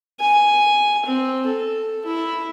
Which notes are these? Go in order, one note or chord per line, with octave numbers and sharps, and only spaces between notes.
G#5
C4
A4
E4